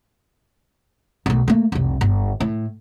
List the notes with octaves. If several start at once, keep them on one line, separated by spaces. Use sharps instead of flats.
B1 A3
A3 A#3
F1 C2
G1
A2